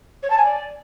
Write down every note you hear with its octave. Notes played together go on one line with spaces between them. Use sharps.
C#5
A5
G#5
D5